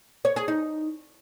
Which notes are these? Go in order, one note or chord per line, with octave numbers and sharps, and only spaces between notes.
C#5
G#4
D#4